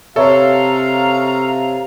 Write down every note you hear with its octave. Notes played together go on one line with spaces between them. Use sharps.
C3 A4 B4 C#5 E5 F5 A#5